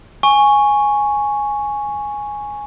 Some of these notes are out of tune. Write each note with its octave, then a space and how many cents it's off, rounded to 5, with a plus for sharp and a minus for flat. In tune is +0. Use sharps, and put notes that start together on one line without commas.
G#5 +0 C#6 +0